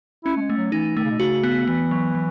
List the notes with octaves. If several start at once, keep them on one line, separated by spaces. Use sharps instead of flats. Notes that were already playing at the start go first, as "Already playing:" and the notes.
C#4 E4
A3
G#3
A3
F#3
E3 D#4
D#3 A3
C#3
B2
C#3 F#4
B3
E3 B3
F#3
F#3